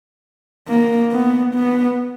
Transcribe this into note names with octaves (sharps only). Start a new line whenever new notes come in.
A#3
B3
B3